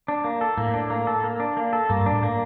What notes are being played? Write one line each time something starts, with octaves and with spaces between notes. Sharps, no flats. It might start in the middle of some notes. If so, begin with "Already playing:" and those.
D4
A#3
A4
A2 A#3
D4
A#3
A4
A#3
D4
A#3
A4
G2 A#3
D4
A2
A#3